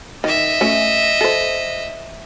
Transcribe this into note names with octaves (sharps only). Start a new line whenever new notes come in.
D#3 D#5 E5
A3 C#4
A4 C5